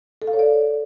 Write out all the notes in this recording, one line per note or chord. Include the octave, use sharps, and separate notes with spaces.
A4
F5
C#5
D5